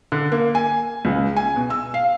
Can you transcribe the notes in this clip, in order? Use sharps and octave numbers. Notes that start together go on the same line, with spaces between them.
D3
A#3
G#5
C#2
G#5
B2
E6
F5